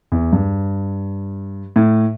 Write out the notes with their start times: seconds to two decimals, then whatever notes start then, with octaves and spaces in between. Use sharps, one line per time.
0.12 E2
0.33 G2
1.76 A2